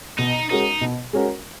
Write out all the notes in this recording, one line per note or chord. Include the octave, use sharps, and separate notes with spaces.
B2 D#4
G#3 C#4 D#4 F#4 A#4
B2
G#3 C#4 F#4 A#4